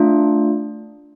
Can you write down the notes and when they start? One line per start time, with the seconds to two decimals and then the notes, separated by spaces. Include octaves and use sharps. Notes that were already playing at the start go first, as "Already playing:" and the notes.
Already playing: A3 D4 F4